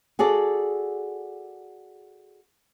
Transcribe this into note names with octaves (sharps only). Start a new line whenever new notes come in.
F#4 G#4 A4 D5